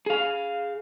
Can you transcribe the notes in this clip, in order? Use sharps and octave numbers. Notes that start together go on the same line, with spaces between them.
G#4 F5